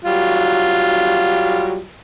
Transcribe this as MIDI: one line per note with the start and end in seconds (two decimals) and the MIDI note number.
0.05 1.83 54
0.05 1.83 55
0.05 1.83 65